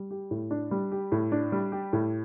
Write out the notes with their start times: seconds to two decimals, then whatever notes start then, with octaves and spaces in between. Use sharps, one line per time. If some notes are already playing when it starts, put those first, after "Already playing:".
Already playing: G3
0.11 G4
0.31 A2
0.51 D4
0.71 G3
0.92 G4
1.12 A2
1.32 D4
1.52 G3
1.72 G4
1.93 A2